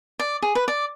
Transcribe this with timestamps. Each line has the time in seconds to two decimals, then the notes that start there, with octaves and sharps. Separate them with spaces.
0.19 D5
0.42 G#4
0.55 B4
0.68 D5